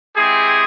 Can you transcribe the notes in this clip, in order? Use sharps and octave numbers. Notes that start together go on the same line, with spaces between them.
G#3 C4 E4 G4 G#4